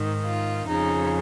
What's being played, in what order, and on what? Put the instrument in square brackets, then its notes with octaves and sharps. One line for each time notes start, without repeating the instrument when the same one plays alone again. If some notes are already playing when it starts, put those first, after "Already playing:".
Already playing: [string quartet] G#2 D#3
F4
F2 C#3 D#4